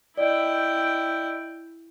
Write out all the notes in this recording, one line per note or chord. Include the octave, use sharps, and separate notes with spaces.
E4 D5 D#5 G5